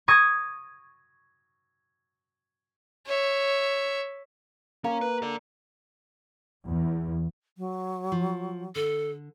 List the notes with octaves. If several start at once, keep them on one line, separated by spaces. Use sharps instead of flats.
C#6 D#6 G#6 A#6
C#5 E5
A#3 C#4
B4
A4 D5
E2
F#3
F3
D3 A4